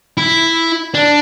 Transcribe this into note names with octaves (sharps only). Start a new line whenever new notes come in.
E4
D4